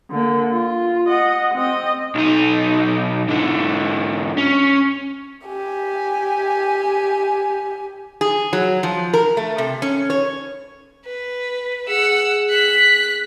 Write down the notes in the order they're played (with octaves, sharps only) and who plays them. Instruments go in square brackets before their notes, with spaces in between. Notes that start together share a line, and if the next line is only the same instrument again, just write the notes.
[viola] D3 A#3
F4
D#5 F#5
C4 D#5
[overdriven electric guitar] B1 D#4
G#2 D3
C#4
[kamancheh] G4 G#5
[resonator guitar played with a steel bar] G#4
F#3
F3
A#4
A3
C3
C#4
C#5
[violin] B4
[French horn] G#4 [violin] F#5 E6
[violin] F#6 B6